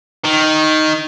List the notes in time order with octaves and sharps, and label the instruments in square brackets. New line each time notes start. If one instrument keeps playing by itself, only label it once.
[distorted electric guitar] D#3